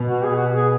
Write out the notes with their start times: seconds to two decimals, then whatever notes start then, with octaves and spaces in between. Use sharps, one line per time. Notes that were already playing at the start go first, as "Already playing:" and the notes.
Already playing: B2
0.08 F#4
0.25 G#4
0.35 F#4
0.57 G#4